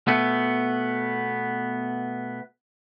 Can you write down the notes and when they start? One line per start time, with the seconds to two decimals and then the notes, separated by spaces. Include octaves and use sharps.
0.07 B2 A3 B3